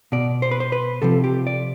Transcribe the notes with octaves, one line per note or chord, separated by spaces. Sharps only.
B2 D5
C5
B4
C5
B4
C3 F3 A4
G4
D5